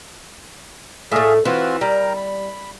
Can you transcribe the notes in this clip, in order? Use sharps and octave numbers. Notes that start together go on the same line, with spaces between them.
A2 A3 G#4 E5 F5
E3 C4 F4 F#4
G3 A#4 G5 A#5
B5